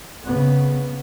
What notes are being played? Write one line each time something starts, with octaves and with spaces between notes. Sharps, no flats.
C#3 B3